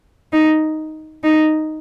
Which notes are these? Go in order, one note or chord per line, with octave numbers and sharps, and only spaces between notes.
D#4
D#4